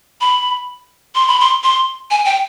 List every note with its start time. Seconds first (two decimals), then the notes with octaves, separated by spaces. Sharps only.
0.21 B5
1.15 C6
1.28 B5
1.40 C6
1.63 C6
2.11 G#5
2.25 G5